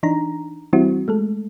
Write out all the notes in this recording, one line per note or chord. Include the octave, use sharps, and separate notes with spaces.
E3 D4 D#4 A#5
E3 G3 C4 E4 F#4
G#3 A3 A4